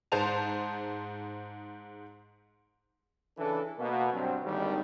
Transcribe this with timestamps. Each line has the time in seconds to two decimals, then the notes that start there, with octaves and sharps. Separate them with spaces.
0.12 G#2 G#4 C5 A5 F7
3.38 C#3 E3 D4 E4 A4
3.78 B2 A#3
4.13 G2 F#3 C4
4.44 G#1 D#2 D3 D#3 G3